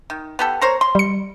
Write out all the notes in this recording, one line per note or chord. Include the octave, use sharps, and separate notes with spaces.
D#3
B3 G4 A4
A#4 C5 C#5
C6
G3 C#7